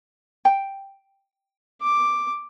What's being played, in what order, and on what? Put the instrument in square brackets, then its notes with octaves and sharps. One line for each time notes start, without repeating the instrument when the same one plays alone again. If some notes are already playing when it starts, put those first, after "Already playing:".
[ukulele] G5
[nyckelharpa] D6